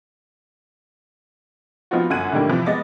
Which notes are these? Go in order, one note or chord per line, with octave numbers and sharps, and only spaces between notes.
F3 B3 C4 D#4 F4 F#4
G1 F#2 F#5 F#6 G#6 D#7
A2 D3 D#3 G3 A#3 E4
C3 E3 F3
G#3 B3 D#5 D6 A6